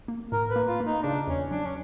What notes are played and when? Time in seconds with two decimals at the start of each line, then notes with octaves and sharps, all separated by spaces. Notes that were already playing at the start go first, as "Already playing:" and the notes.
0.08 A#3
0.32 A2 A#4
0.50 B4
0.56 A#3
0.68 F4
0.80 A#3
0.86 D#4
1.03 C#3 D4
1.27 E2 C#4
1.51 F#3 D4
1.65 C#4